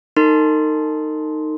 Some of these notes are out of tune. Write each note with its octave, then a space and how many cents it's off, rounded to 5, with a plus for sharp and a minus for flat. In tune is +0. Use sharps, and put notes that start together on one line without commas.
D#4 -5 A#4 -45 C6 +0